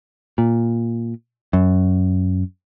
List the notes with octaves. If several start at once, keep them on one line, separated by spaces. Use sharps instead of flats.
A#2
F#2